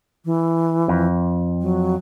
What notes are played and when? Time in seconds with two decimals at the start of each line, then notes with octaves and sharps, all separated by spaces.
0.25 E3
0.88 F2
1.61 F#3